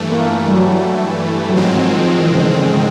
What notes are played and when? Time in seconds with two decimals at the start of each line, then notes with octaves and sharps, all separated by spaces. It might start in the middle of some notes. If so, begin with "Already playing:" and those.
Already playing: G2 E3 A3
0.12 A#3
0.48 G3
0.54 F#3
1.49 F#3
1.56 G#2 D#3 F3 G#3 C4
1.77 F3
1.98 F3
2.19 E3
2.31 C#3
2.39 D3
2.59 C#3